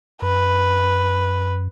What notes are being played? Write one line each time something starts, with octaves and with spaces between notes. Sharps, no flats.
F#2 B4